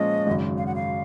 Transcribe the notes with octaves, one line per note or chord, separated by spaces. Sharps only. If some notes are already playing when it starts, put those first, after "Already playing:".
Already playing: A#2 F3 G#3 C#4 F4 D#5
G#1 F#2 C#3
F5
F#5
F5